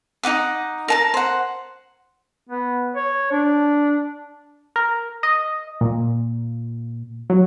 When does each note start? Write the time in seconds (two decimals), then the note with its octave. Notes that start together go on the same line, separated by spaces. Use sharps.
0.23 D#4 D#5 F#5 D6
0.88 A#4 A5 A#5
1.14 C5 F#5
2.49 B3
2.96 C#5
3.31 D4
4.76 A#4
5.23 D#5
5.81 A#2
7.30 F#3